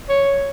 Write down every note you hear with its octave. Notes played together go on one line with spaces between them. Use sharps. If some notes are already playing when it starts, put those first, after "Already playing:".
C#5